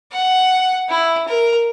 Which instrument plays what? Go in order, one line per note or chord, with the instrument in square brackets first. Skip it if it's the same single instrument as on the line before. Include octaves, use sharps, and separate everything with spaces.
[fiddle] F#5
E4
A#4